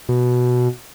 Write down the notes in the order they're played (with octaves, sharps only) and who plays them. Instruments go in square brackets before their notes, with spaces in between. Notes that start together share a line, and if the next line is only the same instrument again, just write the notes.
[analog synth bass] B2